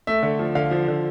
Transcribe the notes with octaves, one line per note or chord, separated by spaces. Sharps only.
A3 E5
D3
F3
D3 F5
F3
D3